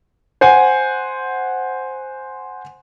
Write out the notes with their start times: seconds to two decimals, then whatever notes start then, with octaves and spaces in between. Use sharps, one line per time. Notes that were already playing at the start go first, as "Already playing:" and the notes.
0.41 C5 F#5 G#5